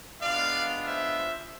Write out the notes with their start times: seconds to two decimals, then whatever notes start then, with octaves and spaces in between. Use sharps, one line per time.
0.22 G#3 B3 D4 F4 D5 F5
0.86 C5 E5